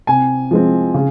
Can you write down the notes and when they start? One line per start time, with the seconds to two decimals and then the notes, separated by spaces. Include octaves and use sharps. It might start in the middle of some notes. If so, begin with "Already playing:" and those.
0.07 C3 G#5
0.51 F3 G#3 C4
0.94 C#3